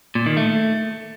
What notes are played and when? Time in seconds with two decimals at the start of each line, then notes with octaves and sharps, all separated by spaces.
0.15 A#2
0.26 D#3
0.37 A3